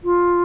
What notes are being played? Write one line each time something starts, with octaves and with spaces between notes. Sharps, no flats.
F4